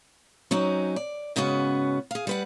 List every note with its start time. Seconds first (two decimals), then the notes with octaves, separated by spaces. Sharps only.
0.51 F#3 C4 C#4 D#4
0.96 D5
1.36 G#2 C#3 B3 C#4 F#4
2.11 G#4 F5
2.27 G3 B4 F#5